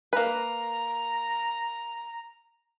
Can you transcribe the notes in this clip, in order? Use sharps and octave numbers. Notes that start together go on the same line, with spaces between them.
A#3 B4 A#5